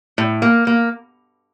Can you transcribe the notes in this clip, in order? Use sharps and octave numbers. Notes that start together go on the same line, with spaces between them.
A2
A#3
A#3